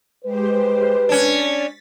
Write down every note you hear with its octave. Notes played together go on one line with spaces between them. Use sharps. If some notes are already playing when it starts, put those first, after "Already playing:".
G#3 G4 B4 C5
C#4 D4 A6 B6